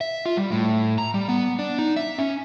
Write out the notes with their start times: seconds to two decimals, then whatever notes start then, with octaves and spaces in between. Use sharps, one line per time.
0.01 E5
0.26 F4
0.37 G3
0.51 A2
0.98 A#5
1.14 G3
1.28 B3
1.59 D4
1.79 D#4
1.96 E5
2.18 C#4